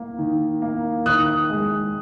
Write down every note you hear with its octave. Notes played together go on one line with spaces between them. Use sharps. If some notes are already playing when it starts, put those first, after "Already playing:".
Already playing: A#3
D#3
A#3
D#3 D#6 F#6
G#3